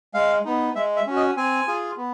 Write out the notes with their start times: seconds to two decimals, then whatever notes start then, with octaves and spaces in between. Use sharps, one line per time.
0.14 G#3 F5
0.45 B3 D#4
0.75 G#3 E5
0.96 E5
1.07 C#4 F#4
1.16 D#5
1.36 C4 G#5
1.67 F4 G#4
1.97 B3